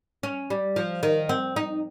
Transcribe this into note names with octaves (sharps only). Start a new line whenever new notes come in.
C#4
G3
F3
D#3
C4
D#4